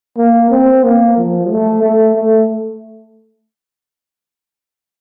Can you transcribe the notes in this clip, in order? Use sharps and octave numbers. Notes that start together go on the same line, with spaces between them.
A#3
C4
A#3
F3
A3
A3
A3